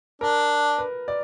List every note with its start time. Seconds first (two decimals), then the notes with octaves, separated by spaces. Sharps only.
0.21 D4 A#4
0.78 B4
1.08 D5